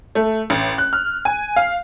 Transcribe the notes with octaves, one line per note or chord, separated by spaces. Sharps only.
A3
A1
F#6
F6
G#5
F5